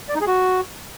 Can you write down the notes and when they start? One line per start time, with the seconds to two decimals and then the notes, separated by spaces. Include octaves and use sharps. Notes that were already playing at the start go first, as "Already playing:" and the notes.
0.09 D5
0.15 D#4
0.21 G#4
0.27 F#4